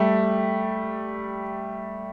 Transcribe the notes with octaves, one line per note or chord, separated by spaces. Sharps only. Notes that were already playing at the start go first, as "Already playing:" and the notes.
Already playing: G3 A3